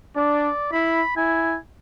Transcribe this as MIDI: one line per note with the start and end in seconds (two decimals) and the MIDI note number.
0.16 0.50 62
0.16 0.72 74
0.72 1.02 64
0.72 1.13 83
1.17 1.58 64
1.17 1.56 80